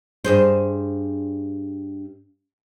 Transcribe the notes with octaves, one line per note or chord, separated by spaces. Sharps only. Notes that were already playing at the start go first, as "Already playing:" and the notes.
G2 G#4 C5